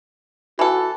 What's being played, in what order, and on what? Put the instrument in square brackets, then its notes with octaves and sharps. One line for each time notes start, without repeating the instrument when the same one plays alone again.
[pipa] E3 A4 [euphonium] F#4